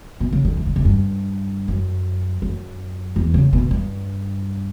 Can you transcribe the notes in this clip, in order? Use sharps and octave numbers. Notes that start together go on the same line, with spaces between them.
B2
C#3
D3
E3
D3
C#3
G2
F#2
F#2
E2
C#3
B2
G2